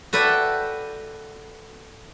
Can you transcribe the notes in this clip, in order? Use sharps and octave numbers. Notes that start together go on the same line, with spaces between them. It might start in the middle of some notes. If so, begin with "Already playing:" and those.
F#4 A4 B4 D5 E5 G5